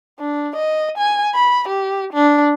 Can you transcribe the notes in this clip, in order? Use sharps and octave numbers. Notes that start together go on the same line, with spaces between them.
D4
D#5
G#5
B5
G4
D4